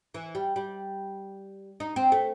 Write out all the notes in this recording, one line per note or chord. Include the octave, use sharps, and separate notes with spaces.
E3
G3
G3
D#4
C4
A3